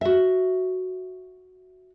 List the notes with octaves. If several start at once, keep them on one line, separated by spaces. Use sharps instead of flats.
F#4 E5